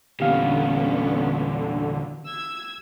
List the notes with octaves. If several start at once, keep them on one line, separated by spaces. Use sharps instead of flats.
E2 A#2 D3 B3 C#4 G4 F5
E6 G#6